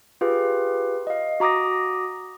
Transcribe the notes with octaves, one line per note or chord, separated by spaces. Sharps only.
F4 G4 G#4 B4 F5
D#5 F5
F#4 A#5 D6 D#6 A#6